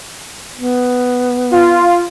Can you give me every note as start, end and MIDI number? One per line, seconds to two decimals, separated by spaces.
0.55 1.94 59
1.53 2.05 65